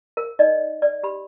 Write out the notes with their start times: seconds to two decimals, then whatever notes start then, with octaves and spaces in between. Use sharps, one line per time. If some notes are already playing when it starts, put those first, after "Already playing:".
0.17 A#4
0.39 D#4 D5 D#5
0.82 D5
1.03 G4 B5